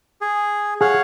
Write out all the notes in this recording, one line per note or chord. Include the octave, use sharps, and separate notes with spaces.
G#4
G#4 C#5 F5 F#5